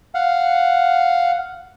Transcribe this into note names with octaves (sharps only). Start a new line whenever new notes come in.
F5 F#5